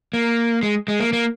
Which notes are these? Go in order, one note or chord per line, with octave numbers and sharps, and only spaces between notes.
A#3
G#3
G#3
A#3
A#3